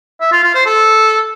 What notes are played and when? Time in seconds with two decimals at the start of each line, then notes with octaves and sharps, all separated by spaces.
0.20 E5
0.32 F4
0.43 F4
0.54 C5
0.65 A4